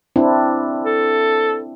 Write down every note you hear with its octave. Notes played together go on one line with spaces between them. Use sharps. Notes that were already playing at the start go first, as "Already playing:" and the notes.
C4 D4 E4
A4